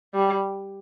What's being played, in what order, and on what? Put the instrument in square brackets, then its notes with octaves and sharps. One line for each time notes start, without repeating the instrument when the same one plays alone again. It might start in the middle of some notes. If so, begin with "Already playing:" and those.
[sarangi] G3